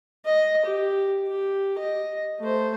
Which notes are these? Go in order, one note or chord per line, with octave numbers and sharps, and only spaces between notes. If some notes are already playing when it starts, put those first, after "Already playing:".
D#5
G4
G4
D#5
A3 C5